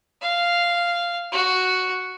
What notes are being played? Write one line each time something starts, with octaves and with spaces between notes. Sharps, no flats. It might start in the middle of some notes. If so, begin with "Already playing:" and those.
F5
F#4